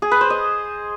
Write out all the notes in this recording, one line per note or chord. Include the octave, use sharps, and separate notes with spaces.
G#4
B4
C5
D#5